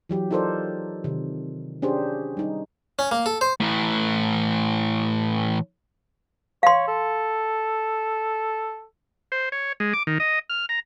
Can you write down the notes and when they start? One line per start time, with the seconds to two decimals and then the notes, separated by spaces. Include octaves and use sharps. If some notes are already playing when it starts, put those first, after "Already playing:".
0.09 E3 F#3 G4
0.31 D#4 F4 A4 A#4 C5 D5
1.04 C3 D#3
1.82 C#4 D4 G4 G#4 C5 D5
2.37 G3 D#4
2.99 C#4
3.11 A#3
3.26 A4
3.41 C5
3.60 A2 E3
6.63 C#5 F5 C6
6.88 A4
9.32 C5
9.52 C#5
9.80 G#3
9.93 D6
10.07 D#3
10.20 D#5
10.50 F6
10.69 A#5